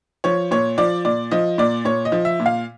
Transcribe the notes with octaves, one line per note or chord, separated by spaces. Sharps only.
F3 C#5
A#2 C#5
F3 D5
A#2 D5
F3 D#5
A#2 D5
A#2 C#5
D#5
F3
E5
A#2
F5